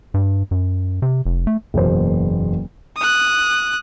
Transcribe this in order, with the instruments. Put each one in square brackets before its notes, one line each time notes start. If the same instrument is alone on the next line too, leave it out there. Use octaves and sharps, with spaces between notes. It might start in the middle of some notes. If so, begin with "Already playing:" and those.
[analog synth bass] G2
F#2
C3
F1
A3
[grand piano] F#1 E2 B2 A#3 C5
[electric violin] D#6 F#6